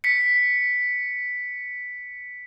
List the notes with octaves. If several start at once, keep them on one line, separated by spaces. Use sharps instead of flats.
B6 C#7